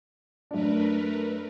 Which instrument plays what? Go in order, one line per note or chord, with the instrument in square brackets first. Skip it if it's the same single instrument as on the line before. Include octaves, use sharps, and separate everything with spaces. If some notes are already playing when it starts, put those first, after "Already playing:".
[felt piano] F#2 D4 [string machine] A3 A#4 B4